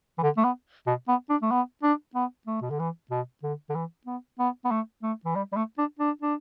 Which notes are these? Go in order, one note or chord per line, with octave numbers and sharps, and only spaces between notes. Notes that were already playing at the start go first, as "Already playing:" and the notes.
E3
D3
A3
B3
B2
B3
D4
A3
B3
D4
B3
A3
B2
D3
E3
B2
D3
D3
E3
B3
B3
B3
A3
A3
E3
G3
G3
A3
D4
D4
D4